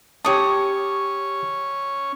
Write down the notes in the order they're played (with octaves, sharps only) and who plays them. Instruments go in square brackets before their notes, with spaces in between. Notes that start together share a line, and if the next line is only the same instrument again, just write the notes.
[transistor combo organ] C#4 [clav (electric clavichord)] G4 A5 [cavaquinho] C#5 D#6